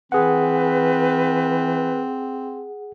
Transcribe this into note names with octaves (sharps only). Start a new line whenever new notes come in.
E3 C4 G#4 B4 F#5